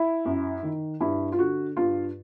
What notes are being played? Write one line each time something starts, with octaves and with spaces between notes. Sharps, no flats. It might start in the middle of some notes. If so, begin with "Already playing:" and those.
Already playing: E4
F#2
D#3
G2 E4
F4
D3 F#4
G2 F4